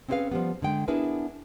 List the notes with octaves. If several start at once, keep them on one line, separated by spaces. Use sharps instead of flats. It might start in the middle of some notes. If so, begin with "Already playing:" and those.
C4 C#4 E4 G#4 B4 F5
F3 G3 B3
D3 G#3 G5
B3 D4 E4 G#4 A#4 B4